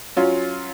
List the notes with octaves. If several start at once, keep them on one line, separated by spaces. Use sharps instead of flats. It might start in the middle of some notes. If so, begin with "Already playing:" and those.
F#3 C#4 F4